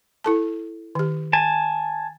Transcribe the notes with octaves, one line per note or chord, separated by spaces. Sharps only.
E4 A4 A5
D#3 G4
G#5 A5